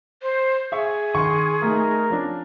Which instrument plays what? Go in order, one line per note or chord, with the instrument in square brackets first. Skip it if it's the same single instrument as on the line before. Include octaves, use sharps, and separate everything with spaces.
[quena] C5
[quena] G#4 [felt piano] E5 C#6
[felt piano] D#3 [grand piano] C6 C#6
[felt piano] A3 D#4 [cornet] A#4
[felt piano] F3 C#4 D4